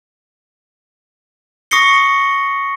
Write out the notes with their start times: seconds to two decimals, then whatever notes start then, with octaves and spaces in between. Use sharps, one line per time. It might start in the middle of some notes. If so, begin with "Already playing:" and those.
1.71 C#6 D#6 A#6 C7 C#7 G7